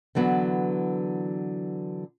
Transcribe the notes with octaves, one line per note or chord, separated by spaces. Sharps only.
D3 E3 F#3 B3